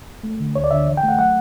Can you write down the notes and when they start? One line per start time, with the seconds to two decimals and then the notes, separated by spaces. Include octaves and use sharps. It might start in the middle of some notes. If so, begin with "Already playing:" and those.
0.23 A3
0.40 D3
0.55 D2 C#5
0.64 D5
0.71 D3 E5
0.88 E3
0.97 G5
1.03 A3
1.09 F#5
1.19 F#3 F#5